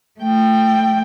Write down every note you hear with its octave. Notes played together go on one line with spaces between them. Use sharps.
A3 G5